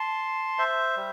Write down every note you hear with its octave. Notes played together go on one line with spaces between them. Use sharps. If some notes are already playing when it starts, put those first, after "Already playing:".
Already playing: A5 C6
C5 E5
G3